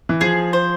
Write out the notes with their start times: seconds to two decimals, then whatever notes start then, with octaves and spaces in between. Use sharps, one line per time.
0.09 E3
0.21 F3 G#4
0.53 C5